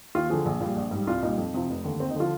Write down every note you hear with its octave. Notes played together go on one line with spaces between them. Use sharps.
D#2 F4
D3 F3 G#4
A#1
A#2 G3
A#1
G#2 G3
C2 F4
A#2 G3 D#4
F2
C3 F3
F1
D#2 D3
D#2 C4
D#4
D3 F3 F4